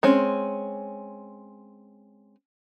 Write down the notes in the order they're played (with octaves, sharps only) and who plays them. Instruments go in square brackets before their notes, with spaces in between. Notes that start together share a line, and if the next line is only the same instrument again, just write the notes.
[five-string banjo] G#3 C4 C#4